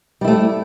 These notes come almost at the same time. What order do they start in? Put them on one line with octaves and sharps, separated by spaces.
G3 E4 A3